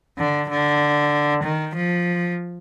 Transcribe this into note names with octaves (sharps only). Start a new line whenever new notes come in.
D3
D3
D#3
F3